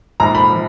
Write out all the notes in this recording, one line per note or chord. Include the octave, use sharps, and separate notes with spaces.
A#1 G#2 F3 A#5
B5
F3